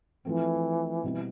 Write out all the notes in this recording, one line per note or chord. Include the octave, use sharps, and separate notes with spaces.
E3 F3 A3 C4
B2 G3 C4 E4